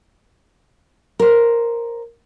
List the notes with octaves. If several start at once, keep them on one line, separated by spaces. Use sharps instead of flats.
A#4 C5